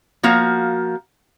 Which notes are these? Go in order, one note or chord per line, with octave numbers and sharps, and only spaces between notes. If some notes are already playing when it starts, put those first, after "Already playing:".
F3 A#3 F#4 F5